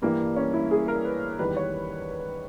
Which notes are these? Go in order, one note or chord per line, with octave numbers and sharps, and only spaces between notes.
G2 E3 G3 A#3
C#4
E4
G#4
A#4
B4
E2 D#3 G3 B4
C#5